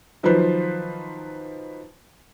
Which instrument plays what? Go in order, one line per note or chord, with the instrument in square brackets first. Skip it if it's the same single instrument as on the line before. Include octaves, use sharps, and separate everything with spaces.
[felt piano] D#3 F3 F#3 F4 B4 C5